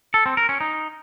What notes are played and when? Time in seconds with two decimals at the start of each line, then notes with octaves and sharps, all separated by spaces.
0.14 A4
0.26 C4
0.37 A#4
0.49 C#4
0.61 D#4